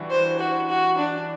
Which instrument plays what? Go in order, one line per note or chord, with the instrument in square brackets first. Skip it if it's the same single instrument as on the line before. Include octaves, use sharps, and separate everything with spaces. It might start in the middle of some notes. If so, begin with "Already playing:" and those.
Already playing: [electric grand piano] E3 G3 D4 F#4
[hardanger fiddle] C5
F#4
F#4
D4